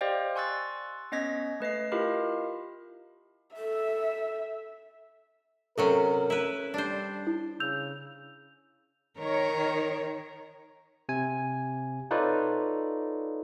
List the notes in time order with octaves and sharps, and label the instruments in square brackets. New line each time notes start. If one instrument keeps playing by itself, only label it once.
[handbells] G4 C5 D5 D#5 F5 G5
G#5 C6 C#6 E6 F#6 A6
B3 C#4 D#5 G#6 A#6 B6
A3 B4 D#5 C7
E4 F4 G4 A#4 D#5 F5
[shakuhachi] A4 [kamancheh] E5
[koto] C3 F#3 C#4 [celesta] A4 [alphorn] A#4
[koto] E4 B4
[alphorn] G3 [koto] D4 C5
[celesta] E4
[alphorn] C#3 [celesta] E6 G6 F7
[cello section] D#3 C#5 [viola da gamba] A#4
[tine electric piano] C3 G#5
D#4 F4 A4 B4 C#5 D5